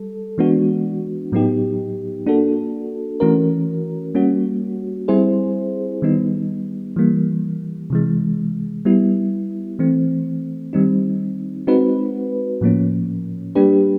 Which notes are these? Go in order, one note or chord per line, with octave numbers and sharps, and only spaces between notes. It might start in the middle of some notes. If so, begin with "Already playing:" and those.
Already playing: G3 A4
E3 G#3 B3 D4 F#4
A2 F#3 B3 D#4 G4
A#3 D4 F#4 A4
E3 A3 C#4 F#4 A#4
G3 A#3 C#4 F#4
G3 C4 E4 G#4 C5
D#3 G3 B3 D#4
E3 G3 A#3
C3 E3 G#3
G3 B3 E4
E3 A3 C4
D#3 G3 C4 D#4
G#3 C4 D#4 F#4 B4
A2 F3 A#3 C#4
G3 A#3 D4 G4 B4